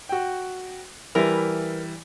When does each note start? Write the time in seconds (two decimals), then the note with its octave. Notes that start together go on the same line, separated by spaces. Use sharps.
0.09 F#4 G5
1.15 E3 G3 E4 A#4 B4